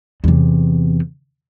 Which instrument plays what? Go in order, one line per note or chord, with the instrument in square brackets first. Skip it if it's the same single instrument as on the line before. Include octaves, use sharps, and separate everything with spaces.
[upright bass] E2 C3